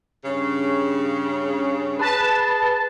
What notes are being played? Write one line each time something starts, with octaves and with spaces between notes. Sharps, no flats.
G2 C#3
G#4 B4 A5